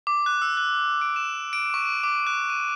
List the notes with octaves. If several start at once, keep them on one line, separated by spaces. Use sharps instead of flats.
D6
F#6
E6
F#6
D7
E7
D7
C#6
D6
F#6
D#7